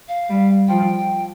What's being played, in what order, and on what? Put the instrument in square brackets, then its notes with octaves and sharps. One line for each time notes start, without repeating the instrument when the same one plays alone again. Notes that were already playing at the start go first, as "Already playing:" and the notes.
[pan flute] F5
[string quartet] G3
[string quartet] F3 [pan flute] G5